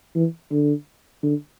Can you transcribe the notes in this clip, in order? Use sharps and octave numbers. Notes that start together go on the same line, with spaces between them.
E3
D3
D3